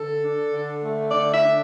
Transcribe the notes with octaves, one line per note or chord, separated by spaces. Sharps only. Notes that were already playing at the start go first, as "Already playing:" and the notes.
Already playing: D3 A4
D4
D3
A3
D3 D5
E5
D4